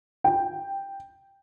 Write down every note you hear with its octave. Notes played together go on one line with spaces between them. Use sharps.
G5